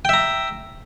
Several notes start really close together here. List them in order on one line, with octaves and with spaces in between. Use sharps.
G5 E5 A#5